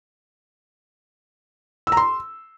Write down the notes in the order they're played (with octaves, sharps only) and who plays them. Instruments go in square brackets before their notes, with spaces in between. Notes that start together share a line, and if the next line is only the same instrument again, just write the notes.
[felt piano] E6
A#5
C6